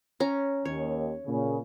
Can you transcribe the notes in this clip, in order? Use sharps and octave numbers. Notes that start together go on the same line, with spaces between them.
C#4 A#5
D#2 C#5
A#2 C#3